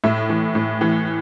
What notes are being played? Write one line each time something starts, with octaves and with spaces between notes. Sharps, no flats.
A2 E5
E3
A2
E3